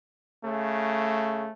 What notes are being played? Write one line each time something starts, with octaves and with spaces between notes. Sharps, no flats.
C#3 A3